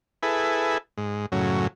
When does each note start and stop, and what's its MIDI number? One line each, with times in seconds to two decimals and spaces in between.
0.23 0.78 64
0.23 0.78 68
0.23 0.78 69
0.23 0.78 71
0.97 1.26 44
1.32 1.67 42
1.32 1.67 45
1.32 1.67 49
1.32 1.67 54